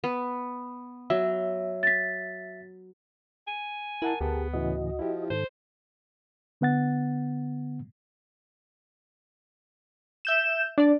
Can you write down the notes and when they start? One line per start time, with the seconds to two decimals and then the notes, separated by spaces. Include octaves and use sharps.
0.04 B3
1.10 F#3 E5
1.83 A6 B6
3.47 G#5
4.02 E4 A#4 F#5 A5
4.21 D2 B3 G4 G#4
4.53 A2 C#3 E3 F#4 D#5
4.99 F3 E4 G4
5.30 G#2 D#3 A4 C5
6.61 D3 B3 F#5 A6
10.25 E5 G6 E7
10.78 D4 D5